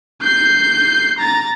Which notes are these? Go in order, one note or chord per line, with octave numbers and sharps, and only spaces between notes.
G6 C7
A#5 A6